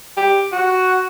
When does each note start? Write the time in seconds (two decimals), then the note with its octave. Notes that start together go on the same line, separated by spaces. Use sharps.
0.17 G4
0.52 F#4